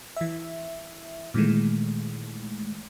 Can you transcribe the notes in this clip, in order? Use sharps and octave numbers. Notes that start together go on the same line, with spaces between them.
E3 E5
A#2 D#3 E3 G#3 A3